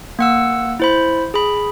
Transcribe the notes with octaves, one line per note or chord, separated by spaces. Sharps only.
A#3 F#5 E6
E4 C5 B5
G#4 B5